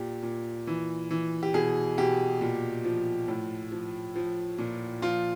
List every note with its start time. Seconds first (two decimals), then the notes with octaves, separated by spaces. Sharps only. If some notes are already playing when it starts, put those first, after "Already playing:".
Already playing: A#2 G4
0.23 A#2
0.67 E3
1.11 E3
1.43 G4
1.54 B2 G#4
1.98 B2 G4
2.41 A#2
2.85 F3
3.28 A2
3.72 F3
4.16 F3
4.58 A#2
5.02 F3 F4